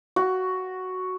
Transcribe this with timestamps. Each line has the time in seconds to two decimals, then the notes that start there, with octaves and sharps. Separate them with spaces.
0.16 F#4